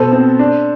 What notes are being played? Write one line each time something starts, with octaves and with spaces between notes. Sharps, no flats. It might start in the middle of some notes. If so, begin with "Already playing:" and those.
Already playing: B2 B3 A4 C5
C4
D4